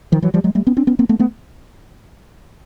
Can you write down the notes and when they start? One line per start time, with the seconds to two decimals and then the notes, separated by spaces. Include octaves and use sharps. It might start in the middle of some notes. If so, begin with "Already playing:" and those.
0.12 D#3 F3
0.22 E3 F#3
0.34 F3 G3
0.44 F#3 G#3
0.55 G3 A3
0.67 B3 C#4
0.77 C4 D4
0.87 B3 C#4
0.99 A#3 C4
1.09 A3 B3
1.19 A3 B3